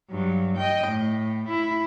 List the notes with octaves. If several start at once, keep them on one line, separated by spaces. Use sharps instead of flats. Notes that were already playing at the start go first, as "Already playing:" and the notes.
G2 F#3
D#5 G5
A2
E4